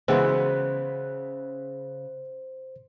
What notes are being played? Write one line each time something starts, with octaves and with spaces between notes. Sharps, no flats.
C#3 E3 G#3 B3 F#4 C5